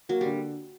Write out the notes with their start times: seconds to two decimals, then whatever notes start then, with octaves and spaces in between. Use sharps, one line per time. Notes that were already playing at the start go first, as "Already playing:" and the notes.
0.09 F#3 A#3
0.21 D3 G3